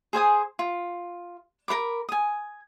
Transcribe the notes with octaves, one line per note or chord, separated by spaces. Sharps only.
G#4 C5 G#5 D#6
F4
A#4 C5 B5 D6
G#5 D#6